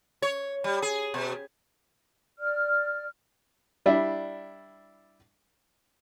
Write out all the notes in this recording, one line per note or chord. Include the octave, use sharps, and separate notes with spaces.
C#5
G3
G#4
B2
D5 F6
G3 D4 E4